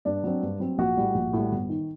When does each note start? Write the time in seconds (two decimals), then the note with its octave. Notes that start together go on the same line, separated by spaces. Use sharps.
0.05 G2 D4 D5
0.24 F#3 C4
0.43 G2
0.60 F#3 C4
0.78 A#1 F#4 F#5
0.97 A2 G3
1.15 A#1
1.33 A2 G3
1.52 G1
1.69 D#3